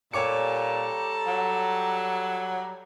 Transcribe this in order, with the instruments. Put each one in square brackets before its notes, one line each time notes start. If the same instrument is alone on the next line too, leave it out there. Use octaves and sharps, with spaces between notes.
[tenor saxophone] A#2 [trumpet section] G3 G4 A#5 [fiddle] A4 [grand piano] C#5 D6 C#7
[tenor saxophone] F#3